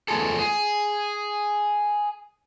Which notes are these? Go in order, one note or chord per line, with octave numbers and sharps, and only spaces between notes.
E2 A3 F4 G#4 A4
G#4